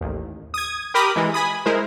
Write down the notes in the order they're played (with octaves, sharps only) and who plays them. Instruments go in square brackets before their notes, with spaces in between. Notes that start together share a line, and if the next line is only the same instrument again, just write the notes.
[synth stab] A1 D#2
D#6 G#6
G4 A#4 B5 D6 D#6
E3 G#3
G#5 B5 D#6
G#3 E4 A#4 C5